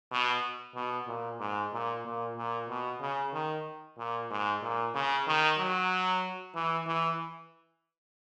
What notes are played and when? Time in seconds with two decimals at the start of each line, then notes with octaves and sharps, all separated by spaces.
0.12 B2
0.75 B2
1.08 A#2
1.40 G#2
1.73 A#2
2.05 A#2
2.37 A#2
2.69 B2
3.01 C#3
3.34 D#3
3.98 A#2
4.31 G#2
4.62 A#2
4.95 C#3
5.27 D#3
5.59 F#3
6.55 E3
6.87 E3